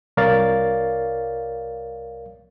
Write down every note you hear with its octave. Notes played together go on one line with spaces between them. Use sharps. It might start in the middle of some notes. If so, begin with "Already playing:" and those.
C2 A#4 C#5 D5 F5 A6